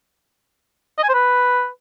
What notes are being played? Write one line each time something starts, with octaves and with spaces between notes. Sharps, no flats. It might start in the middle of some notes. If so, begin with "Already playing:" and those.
D#5
G#5
C5
B4